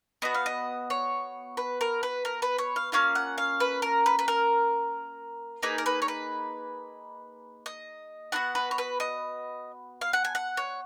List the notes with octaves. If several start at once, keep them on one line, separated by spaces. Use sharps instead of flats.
B3 F#4 D#5
F5
D#5
C#5
B4
A#4
B4
A#4
B4
C#5
F5
A#3 C#4 F4 F5
F#5
F5
B4
A#4
B4
B4
A#4
A#3 D#4 G#4 B4
A#4
B4
C#5
B4
D#5
B3 D#4 F#4 F#5
B4
C#5
B4
D#5
F5
F#5
G#5
F#5
C#5